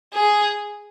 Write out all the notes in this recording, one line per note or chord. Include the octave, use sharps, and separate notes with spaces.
G#4